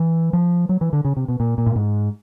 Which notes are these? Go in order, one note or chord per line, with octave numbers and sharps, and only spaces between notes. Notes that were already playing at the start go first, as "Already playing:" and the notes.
Already playing: E3
F3
F#3
E3
D3
C#3
C3
B2
A#2
A#2
A2
G#2